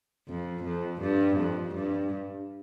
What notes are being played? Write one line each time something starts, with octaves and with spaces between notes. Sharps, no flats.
F2
F2
G2
F2
G2